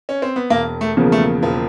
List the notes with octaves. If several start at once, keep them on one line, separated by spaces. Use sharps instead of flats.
C#4
C4
B3
E1 A#3
A3
E2 C#3 F3 A#3
A3
E1 F3